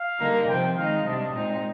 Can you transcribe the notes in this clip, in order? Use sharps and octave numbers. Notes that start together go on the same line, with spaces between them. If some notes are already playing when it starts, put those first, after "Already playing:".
Already playing: F5
D3 G3 A#3 D#4
C3 F3 C4 G5
D#3 G#3 D#4 F5
C3 G3 D4 D#5
A#2 G#3 C4 D#4